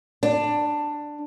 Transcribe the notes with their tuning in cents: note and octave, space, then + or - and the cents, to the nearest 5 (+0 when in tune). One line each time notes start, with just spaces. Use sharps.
D4 +10